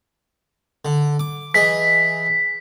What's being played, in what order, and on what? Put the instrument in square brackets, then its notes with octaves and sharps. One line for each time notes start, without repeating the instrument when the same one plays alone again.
[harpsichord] D3
D6
[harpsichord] E3 G#4 D#5 [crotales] B6